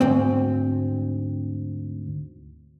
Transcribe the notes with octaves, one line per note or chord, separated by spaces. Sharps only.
D2 G#2 C4